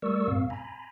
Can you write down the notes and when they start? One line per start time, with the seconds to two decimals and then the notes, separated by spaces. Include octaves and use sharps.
0.02 G3 A3 A#4 D5 C#6 E6
0.27 G2 A#2 C4 F5
0.50 G#5 A#5 B5